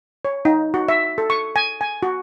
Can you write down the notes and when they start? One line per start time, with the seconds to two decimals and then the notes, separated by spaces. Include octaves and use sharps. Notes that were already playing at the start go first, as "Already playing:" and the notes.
0.25 C#5
0.45 D#4
0.74 F#4
0.89 E5
1.18 A4
1.30 C#6
1.56 G#5
1.81 G#5
2.03 F#4